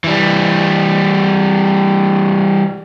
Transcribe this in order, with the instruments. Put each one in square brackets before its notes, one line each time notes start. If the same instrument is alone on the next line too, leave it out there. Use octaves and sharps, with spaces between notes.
[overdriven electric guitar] E3 G3